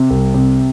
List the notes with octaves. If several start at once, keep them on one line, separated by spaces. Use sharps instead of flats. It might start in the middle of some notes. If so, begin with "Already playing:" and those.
Already playing: C3
C2
C3